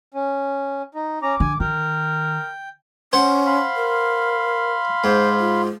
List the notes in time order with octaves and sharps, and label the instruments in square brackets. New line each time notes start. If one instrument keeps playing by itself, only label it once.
[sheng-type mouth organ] C#4
D#4
[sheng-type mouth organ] C#4 A#5 [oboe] D6
[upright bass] D3 [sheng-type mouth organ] G#5
[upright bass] D#3 [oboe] A#4 [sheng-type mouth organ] G5
[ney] C#4 [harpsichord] C5 F#5
[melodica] F5 B5 C6
[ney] A#4
[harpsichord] G#2 [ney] C5
[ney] F4